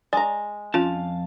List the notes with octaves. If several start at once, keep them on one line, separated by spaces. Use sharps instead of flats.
G#3 D5 A#5
F2 C#4 F4 F5 A5